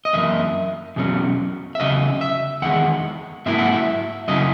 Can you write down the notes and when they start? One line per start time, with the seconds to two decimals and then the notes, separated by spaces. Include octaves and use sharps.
0.05 D#5
0.13 F#2 E3 A#3 E5
0.96 E2 B2 F#3 C#4
1.75 E5
1.80 E2 C#3 F#3 D#5
2.21 E5
2.62 E2 D#3 G#3 F#5
3.46 G#2 F#3 A#3 E4 E5
3.59 F#5
3.73 E5
4.28 F#2 C#3 F#3 C#4 E4 D#5